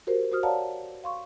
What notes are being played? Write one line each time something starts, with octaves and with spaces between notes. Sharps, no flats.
F#4 G4 A#4 C5
F#4 C5 D#6 F6
C#5 D5 F5 F#5 A5 A#5
F5 C6 C#6